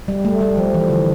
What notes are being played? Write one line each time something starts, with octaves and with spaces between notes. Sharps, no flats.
G3
A3
G3
F3
E3
D3